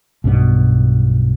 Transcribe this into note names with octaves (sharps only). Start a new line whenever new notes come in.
B1 G2 B2 B3